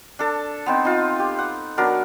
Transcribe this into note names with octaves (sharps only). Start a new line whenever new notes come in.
D4 A4
B3 C4 D#4
D#4 F4
G4
F#5
F#3 B3 D4 A#4